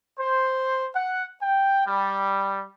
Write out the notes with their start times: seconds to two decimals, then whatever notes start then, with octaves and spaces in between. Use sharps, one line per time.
0.18 C5
0.94 F#5
1.41 G5
1.86 G3